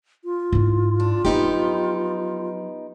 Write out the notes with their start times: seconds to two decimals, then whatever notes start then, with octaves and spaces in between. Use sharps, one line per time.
0.25 F4
0.52 G#2 E4
1.00 D4
1.25 F3 F#3 B3 D#4 G4